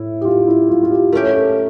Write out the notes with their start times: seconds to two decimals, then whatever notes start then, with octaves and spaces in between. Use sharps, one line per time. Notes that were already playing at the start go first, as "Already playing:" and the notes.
Already playing: A2 E4
0.21 G4
0.25 F4
0.47 E4
0.69 F4
0.83 F4
0.91 G4
1.12 A3 C#4 G4 A#4
1.34 A4